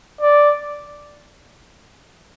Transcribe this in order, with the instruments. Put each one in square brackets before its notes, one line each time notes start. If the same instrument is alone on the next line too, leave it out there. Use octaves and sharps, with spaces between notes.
[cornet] D5